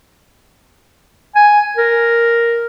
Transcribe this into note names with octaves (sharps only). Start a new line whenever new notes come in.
G#5
A#4